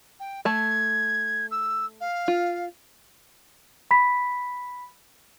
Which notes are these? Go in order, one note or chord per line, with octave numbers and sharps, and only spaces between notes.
G5
A3 A5 G#6
E6
F5
F4
B5 B6